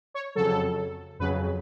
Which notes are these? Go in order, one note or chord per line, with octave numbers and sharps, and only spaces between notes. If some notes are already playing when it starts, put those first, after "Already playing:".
C#5
F2 C#3 F#3 A4
F2 C#3 F#3 B4